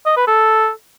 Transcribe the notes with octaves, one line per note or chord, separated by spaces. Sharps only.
D#5
B4
A4